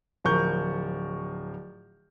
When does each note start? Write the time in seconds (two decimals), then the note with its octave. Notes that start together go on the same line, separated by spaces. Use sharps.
0.24 D1 F3 A#4 C#6 G6